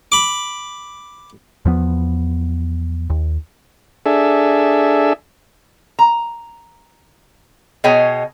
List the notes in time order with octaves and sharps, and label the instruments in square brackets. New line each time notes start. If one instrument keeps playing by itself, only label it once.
[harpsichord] B5 D6
[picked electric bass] E2 F3 B3
D#2
[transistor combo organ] D4 G#4 A4 E5
[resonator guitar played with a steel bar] A#5
B2 G#4 C#5 D#5 G5 G#5